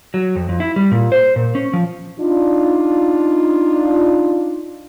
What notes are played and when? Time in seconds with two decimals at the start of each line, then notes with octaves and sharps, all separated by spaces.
0.14 F#3
0.36 F2
0.49 F2
0.60 E4
0.76 G3
0.91 A#2
1.12 C5
1.36 A#2
1.55 C#4
1.74 F3
2.19 D4 D#4 F4